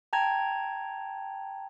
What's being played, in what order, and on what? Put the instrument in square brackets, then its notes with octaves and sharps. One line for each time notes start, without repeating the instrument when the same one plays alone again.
[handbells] G5 A5 A#5 G#6